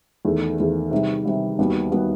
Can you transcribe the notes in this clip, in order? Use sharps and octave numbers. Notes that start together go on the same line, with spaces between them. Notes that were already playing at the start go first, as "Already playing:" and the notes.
E2 D#3 A3
E2 D#3 A3
C3 D#3 G3
C3 D#3 G3
D#2 D#3 G3 B3 F#4
D#3 G3 B3 F#4